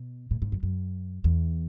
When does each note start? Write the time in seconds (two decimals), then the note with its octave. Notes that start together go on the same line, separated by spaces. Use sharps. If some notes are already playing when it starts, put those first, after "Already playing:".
Already playing: B2
0.31 A2
0.42 G#2
0.52 F#2
0.63 F#2
1.24 E2